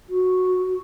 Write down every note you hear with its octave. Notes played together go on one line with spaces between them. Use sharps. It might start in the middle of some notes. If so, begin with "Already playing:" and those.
F#4